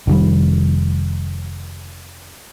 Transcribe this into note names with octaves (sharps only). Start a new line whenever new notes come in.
F1 D#3 G3